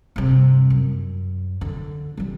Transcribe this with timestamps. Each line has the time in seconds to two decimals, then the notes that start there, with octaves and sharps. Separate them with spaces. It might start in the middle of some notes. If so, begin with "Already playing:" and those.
0.16 G2 C3
0.70 F#2
1.61 D3
2.17 E3 G3